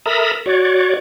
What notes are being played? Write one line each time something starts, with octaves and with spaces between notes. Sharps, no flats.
A4 A#4 E5 A#5 B5 D#6
F#4 C#5 D5